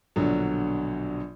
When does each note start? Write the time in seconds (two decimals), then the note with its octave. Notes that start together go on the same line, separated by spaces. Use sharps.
0.16 A#1 B2 D3 F#3